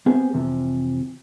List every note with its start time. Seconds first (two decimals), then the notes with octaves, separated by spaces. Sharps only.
0.06 B3 C4 G4 G#4 B4 C5
0.33 F2 C3 E3 F3